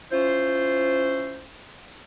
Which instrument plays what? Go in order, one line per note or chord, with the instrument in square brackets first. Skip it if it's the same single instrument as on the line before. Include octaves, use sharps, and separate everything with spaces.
[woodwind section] C#4 E4 F4 C5